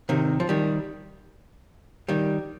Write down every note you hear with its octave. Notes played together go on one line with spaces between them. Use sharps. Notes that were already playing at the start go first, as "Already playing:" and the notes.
C3 D#3
F3
D#3 G3
D#3 G3